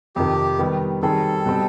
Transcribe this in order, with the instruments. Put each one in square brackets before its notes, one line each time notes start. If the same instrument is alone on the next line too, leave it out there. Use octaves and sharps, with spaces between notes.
[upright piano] F2 C3 D#3 [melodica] G4
[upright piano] D#3 G3 B3 D#4
[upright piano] D#3 G3 C4 D#4 G#4 [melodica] A4
[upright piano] B2 G3 C4